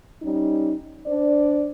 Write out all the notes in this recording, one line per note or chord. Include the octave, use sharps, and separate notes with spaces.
G3 C#4 D#4
D4 C5 D5